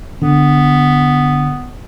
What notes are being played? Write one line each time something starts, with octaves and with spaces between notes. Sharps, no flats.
D3 B3